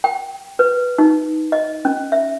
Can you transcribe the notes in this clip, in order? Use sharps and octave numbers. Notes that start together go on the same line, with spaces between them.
G5
B4
D#4
D#5
C#4
E5